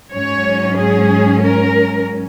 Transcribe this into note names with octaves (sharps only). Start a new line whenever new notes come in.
G#2 F#3 C#4 C#5
G#4
A#4